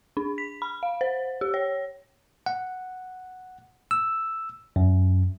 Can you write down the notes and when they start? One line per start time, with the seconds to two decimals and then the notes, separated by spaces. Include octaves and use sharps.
0.17 D4
0.38 B6
0.62 B5
0.83 F5
1.01 C5
1.41 G4
1.54 C#5
2.46 F#5
3.91 E6
4.76 F#2